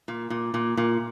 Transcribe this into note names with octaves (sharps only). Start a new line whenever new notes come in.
A#2
A#2
A#2
A#2